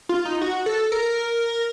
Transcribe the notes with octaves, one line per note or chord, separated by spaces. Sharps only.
F4
D#4
F#4
A4
A#4